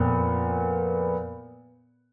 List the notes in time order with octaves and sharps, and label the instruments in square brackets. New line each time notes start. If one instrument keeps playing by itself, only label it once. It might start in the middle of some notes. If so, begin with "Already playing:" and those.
Already playing: [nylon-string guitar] F2 [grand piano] A#2 B3